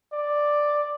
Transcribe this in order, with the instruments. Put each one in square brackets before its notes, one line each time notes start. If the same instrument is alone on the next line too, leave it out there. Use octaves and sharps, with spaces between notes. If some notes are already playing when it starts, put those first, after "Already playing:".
[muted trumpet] D5